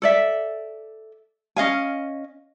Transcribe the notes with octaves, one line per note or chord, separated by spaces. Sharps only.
A4 D5 E5
C#4 D#5 F5 G#5